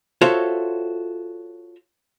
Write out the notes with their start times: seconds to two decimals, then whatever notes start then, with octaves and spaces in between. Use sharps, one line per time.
0.21 F4 F#4 A4 C5 C#5 E5